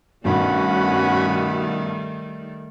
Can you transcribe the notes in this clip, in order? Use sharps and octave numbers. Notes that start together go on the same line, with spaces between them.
G2 B2 D#3 G3 A3 C#4 F#4 B5